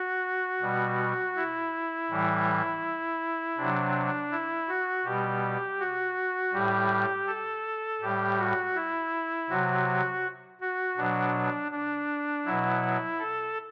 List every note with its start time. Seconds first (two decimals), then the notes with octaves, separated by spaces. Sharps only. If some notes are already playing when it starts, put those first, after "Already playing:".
Already playing: F#4
0.62 B2 G3
1.36 E4
2.10 A2 E3 G3
3.58 C3 F#3 D4
4.31 E4
4.68 F#4
5.05 B2 G3 G4
5.80 F#4
6.53 A2 G3 G4
7.27 A4
8.01 A2 G3 G4
8.38 F#4
8.75 E4
9.50 C3 F#3 F#4
10.61 F#4
10.97 B2 F#3 D4
11.71 D4
12.45 B2 F#3 E4
13.19 A4